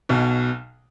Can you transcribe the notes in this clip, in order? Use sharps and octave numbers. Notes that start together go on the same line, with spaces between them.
B1 B2